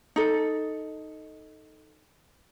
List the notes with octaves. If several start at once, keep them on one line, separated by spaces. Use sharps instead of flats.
D#4 A4